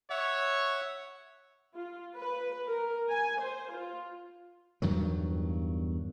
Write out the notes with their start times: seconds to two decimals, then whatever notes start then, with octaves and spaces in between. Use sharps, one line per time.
0.10 C#5 E5 F#5
1.75 F4
2.15 B4
2.68 A#4
3.09 G#5
3.40 C5
3.71 F4
4.82 E2 G2 D#3 F#3